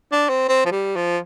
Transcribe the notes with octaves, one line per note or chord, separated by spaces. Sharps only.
D4
C4
C4
F3
G3
F3